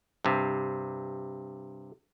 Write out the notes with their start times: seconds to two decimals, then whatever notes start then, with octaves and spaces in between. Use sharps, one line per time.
0.25 G2 C3